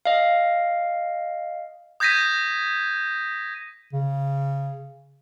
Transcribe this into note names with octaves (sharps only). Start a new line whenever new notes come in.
D#5 F5
D#6 G6 G#6 A#6 B6 D#7
C#3